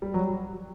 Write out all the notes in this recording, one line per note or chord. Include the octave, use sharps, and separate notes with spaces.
G3
F#3